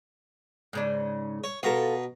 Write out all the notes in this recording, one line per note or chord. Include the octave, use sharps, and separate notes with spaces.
G#2 C#3 D4
C#5
B2 F4 A4 A#5